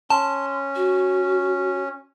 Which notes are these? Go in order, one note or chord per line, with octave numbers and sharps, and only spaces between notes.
C#4 A5 C6
F#4